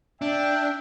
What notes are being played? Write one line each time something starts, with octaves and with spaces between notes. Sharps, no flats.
D4 E5 G5